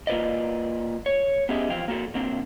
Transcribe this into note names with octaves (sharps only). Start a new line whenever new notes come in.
A#3 F4 B4 D5 D#5
C#5
B3 C#4 G4 G#4 D#5 E5
E3 F3 F5 G5
A#3 F#4 A4
C#3 A#3 C4 D4